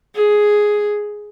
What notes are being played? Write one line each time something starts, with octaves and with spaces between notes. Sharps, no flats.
G#4